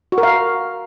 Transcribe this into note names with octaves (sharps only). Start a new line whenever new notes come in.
F#4
A#4
F5